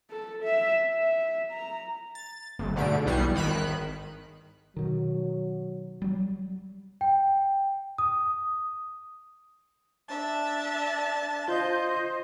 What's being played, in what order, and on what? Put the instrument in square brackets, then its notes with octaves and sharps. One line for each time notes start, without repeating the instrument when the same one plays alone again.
[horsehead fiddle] A4
E5
E5
A#5
[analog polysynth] A6
G1
G#2 B2 D3 A3 D7
B1 E2 B2 G3 C7 C#7
G#1 D#3 B5 F#6
[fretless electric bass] B2 D#3 [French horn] F#3
[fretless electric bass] F#3 G3
[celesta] G5
D#6
[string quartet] D4 E5 A5
[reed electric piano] F4 [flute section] C5 D#5 [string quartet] G6